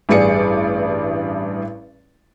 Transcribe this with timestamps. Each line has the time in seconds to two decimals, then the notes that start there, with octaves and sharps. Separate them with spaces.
0.09 A1 G2 G#4 D5 C#7